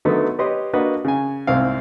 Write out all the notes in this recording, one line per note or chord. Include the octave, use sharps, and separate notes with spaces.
D3 D#3 F#3 A3 B3
G4 B4 C#5 D#5 C6
A#3 D4 F#4 B4 D#5
C#3 G#5
C2 G#2 C4 F5